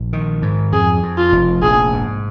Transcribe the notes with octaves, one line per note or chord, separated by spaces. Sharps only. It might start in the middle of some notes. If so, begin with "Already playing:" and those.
Already playing: A#1
D#3
G#2
F2 G#4
F2
F4
F1
A#1 G#4
G#2